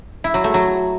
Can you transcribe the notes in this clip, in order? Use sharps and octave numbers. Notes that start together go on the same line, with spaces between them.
E4
F#3
A3
F#3